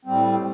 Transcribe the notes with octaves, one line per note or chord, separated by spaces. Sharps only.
A2 G3 C4